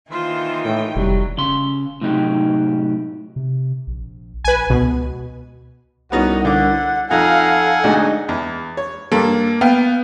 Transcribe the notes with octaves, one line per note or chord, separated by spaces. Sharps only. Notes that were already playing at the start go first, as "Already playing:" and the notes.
D#3 E3 A#3 F4 C5
A2 A3 G5
F1 F#3 G3
C#3 C6
A2 C3 F#3 D#4 G4
C3
A#1
A#1 B4 G#5
C#2 B2
C2 B3 C#4 D#4 F#4
D3 F#5 D6
F2 D#4 A4 F5 F#5 G#5
D2 G#2 D4 D#4
E2
C#5
G2 A#3 A4
B3 F5 G5